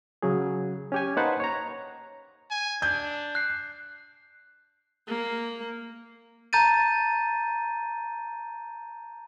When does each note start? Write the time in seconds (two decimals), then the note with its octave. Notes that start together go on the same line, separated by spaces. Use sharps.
0.22 C#3 F#3 G#4
0.92 C#4 G4 G#5
1.17 A#3 D#4 B4 C5 F#5 A5
1.40 C#5 A#5
2.50 G#5
2.82 D4 G6
3.35 F#6 C7
5.09 A#3
6.53 A5 A#5 G6 A6 D#7